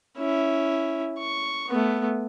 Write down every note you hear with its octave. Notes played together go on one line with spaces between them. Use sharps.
C#4 E4
C#6
A3 B3